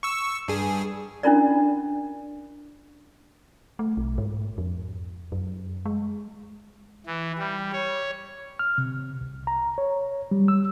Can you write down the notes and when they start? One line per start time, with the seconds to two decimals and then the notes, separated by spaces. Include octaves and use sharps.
0.03 C#6 E6
0.48 G2 G#4
1.23 C#4 D4 E4 F4 A#4 D5
3.79 A3
3.97 B1
4.18 G#2
4.58 F2
5.32 F#2
5.86 G#3
7.06 E3
7.39 G3
7.73 C#5
8.59 F6
8.78 C3
9.21 C2
9.47 A#5
9.78 C#5
10.31 G3
10.48 E6